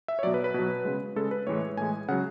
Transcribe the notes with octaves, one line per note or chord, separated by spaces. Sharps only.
E5
C#5
B2 F#3 D5
B4
B4
B2 F#3
C#3 G#3
C#3 G#3 A4
B4
A2 E3 G#3 C#5
A2 E3 G#3 G#5
C#3 F#3 F#5